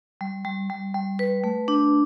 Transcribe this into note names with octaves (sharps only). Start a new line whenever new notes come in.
G3
G3
G3
G3
B4
A3
D4